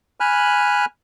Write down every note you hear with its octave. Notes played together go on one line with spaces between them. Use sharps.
G#5 B5 F6 F#6